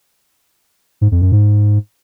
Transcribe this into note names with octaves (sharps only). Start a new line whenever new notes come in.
G#2
F2
F#2
G#2